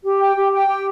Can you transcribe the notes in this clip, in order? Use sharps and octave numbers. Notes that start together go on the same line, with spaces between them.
G4
G5
G4
G5
G4